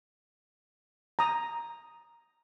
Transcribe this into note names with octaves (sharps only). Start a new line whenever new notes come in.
A#5 D#6